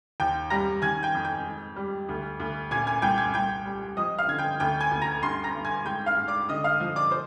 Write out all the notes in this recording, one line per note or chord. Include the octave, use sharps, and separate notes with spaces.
D#2 G5 G6
G3 A#5 A#6
D#3 G#5 G#6
G5 G6
F2
G5 G6
G#2
G3
D2
D2
A#2 G#5 G#6
G#5 G#6
C2 G5 G6
G#5 G#6
C2 G5 G6
G3
F3 D#5 D#6
F5 F6
D3 G#6
G5 G6
D2 G5 G6
G#5 G#6
D2
A#5 A#6
G2 C6 C7
A#5 A#6
G2
G#5 G#6
G#2 G5 G6
F5 F6
G#2
D5 D6
D3 D#5 D#6
F5 F6
F3
D5 D6
C5